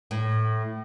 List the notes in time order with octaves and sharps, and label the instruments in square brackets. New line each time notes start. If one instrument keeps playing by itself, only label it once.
[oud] A2